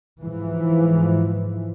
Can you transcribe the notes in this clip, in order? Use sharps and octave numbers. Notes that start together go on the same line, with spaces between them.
G#2 E3 F3